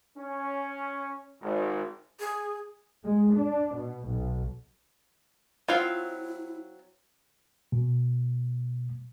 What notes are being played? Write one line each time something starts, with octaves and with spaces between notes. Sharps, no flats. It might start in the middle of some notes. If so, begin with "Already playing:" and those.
C#4
G#1
G#4
G#3
D4
B2
B1
F#3 C4 E4 F4 F5
B2